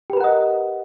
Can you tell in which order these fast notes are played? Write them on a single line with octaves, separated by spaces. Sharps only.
G4 B4 A#4 F#5 D#5